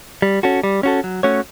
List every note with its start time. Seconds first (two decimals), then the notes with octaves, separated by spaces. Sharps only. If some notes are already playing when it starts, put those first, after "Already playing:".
0.22 G3
0.43 C#4 F#4 A4
0.64 G3
0.83 C#4 F#4 A4
1.04 F#3
1.23 A3 C#4 F#4 C#5